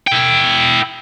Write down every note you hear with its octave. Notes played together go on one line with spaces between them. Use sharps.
E4 G5